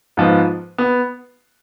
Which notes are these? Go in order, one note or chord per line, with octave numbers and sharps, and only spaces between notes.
G#2 F3 B3
B3